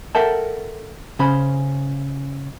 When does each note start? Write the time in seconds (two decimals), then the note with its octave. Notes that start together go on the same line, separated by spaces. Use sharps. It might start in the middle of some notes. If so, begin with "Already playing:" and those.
0.15 A4 A#4 E5 F#5 G5 A5
1.19 C#3 C#4 C5 B5